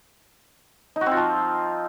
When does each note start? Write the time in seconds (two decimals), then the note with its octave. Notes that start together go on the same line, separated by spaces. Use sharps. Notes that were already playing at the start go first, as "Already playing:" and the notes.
0.96 D#4
1.01 F#4
1.06 C4
1.11 F4
1.17 F3